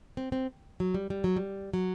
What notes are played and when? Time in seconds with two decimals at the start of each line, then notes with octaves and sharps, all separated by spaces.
0.17 C4
0.32 C4
0.80 F#3
0.94 G3
1.10 G3
1.24 F#3
1.36 G3
1.73 F#3